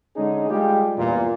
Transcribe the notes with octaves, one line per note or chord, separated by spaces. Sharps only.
D3 G#3 C#4 D#4 G#4
G3 G#3 F4 G4
E2 G2 A#2